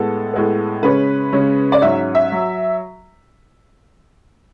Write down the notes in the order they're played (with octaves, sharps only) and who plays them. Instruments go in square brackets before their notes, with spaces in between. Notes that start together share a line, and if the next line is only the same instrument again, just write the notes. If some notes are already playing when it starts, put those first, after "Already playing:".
Already playing: [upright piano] A2 G#3 B3 A4
A2 G#3 B3
C#3 G#3 C#4 B4
C#3 G#3 C#4
D5
G#2 F#3 C#4 E5
E5
F#3